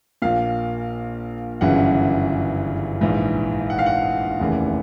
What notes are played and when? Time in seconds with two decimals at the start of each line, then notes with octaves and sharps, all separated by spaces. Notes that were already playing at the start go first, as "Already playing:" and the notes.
0.22 A#1 A#2 F5
1.61 G1 F#2 C#3 E3 F#5
3.01 A#1 G#2 E3
3.70 F#5
3.79 F5
3.86 F#5
4.40 F1 D#2 C#3 E3